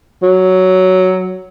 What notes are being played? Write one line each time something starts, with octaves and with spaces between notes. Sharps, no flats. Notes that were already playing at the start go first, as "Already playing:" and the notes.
F#3